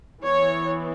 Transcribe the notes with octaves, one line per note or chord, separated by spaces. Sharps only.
E3 B3 C#5